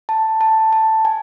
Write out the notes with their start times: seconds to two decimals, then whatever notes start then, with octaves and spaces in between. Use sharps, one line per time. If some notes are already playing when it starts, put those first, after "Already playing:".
0.09 A5
0.41 A5
0.73 A5
1.05 G#5